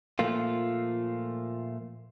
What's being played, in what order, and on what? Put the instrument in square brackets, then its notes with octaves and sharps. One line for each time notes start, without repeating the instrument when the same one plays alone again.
[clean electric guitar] A#2 F3 A3 A#3 F4